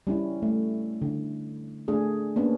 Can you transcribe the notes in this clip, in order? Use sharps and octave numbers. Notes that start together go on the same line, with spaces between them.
G3 C#4 E4
A3
D3
A3 D4 G#4
A#3 B3 C#4 D4